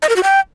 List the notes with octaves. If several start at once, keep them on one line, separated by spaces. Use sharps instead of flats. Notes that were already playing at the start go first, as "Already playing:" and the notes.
D#5
A#4
F#4
G5